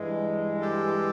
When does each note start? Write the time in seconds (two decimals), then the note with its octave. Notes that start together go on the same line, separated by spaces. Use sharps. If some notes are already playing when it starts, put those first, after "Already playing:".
Already playing: G2 E3 G#3
0.61 G4 A4